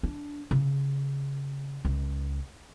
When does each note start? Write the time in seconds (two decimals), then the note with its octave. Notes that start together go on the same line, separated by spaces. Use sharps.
0.03 D4
0.51 C#3
1.85 C#2